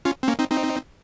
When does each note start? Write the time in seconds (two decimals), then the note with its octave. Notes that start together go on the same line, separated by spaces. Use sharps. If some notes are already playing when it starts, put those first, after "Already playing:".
0.05 C#4 F4
0.23 C4
0.28 A#3 C#4
0.39 C4 D#4
0.50 C4 D#4